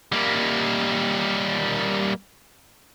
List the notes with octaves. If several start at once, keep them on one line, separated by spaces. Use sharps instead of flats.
G3 A#3